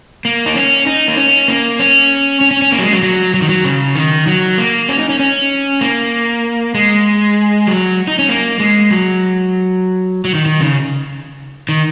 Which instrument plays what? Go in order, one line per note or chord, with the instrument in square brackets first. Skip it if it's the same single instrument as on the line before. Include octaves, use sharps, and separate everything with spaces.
[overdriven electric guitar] A#3
D#4
C#4
D#4
A#3
C#4
A#3
C#4
C#4
C#4
C#4
A#3
F#3
G#3
F#3
F#3
F#3
D#3
F#3
C#3
D#3
F#3
A#3
C#4
D#4
C#4
C#4
A#3
G#3
F#3
D#4
C#4
A#3
G#3
F#3
F#3
D#3
D#3
C#3
D#3